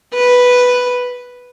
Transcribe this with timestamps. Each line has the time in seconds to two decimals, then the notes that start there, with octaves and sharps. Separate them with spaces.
0.14 B4